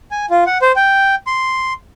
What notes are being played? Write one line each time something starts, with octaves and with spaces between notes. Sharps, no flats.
G#5
F4
F#5
C5
G5
C6